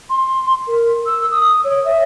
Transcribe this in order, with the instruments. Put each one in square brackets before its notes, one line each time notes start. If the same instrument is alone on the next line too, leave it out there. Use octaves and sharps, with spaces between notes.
[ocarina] C6
A#4
E6
D#6
C#5
E5